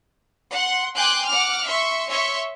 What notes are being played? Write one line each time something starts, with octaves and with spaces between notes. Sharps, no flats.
F#5 C6
G5 G#5 C6 D6 F#6 G6
F#5 D6 F6
E5 C6 C#6
C#5 E5 C6 C#6